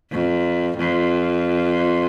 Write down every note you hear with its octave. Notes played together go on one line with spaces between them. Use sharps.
F2
F2